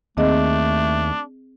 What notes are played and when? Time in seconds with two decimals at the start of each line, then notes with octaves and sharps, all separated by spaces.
0.18 D#2 A3 C4 D4 G#4 D#5